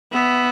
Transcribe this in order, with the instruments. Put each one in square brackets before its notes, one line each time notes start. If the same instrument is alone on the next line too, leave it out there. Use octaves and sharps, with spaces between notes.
[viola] B3 [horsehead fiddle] E5